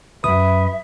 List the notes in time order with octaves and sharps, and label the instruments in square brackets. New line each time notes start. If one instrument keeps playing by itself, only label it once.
[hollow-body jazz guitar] C#2 F#2 [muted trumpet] B4 [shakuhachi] E5 [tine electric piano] D#6